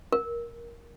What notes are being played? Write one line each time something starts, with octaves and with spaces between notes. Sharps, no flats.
A#4